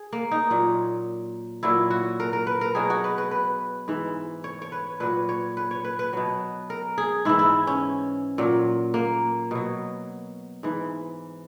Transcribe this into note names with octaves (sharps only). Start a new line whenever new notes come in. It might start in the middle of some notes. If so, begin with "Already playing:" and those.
Already playing: G#4
A#3
D#4
A#2 F#3
A#2 F#3 E4
F#4
A#4
A#4
B4
A#4
B2 F#3 G#4
F#4
B4
B4
B4
G#2 E3
C#5
C#5
B4
A#2 F#3 B4
C#5
B4
C#5
B4
B4
B2 F#3
A#4
G#4
G#2 E3 E4
E4
C#4
A#2 F#3
A#3
B2 F#3
G#2 E3